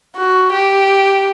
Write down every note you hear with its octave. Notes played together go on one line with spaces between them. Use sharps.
F#4
G4